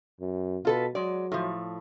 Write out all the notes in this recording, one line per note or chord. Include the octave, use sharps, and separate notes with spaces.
F#2
B2 F4 A4 B4
F#3 G#3 D5
A2 F3